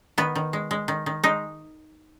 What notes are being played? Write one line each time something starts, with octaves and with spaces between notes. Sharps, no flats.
D#3 B3
D#3
G#3
G#3
D#3
D#3
G#3 D#4